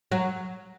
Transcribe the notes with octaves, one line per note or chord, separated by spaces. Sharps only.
F#3 F#4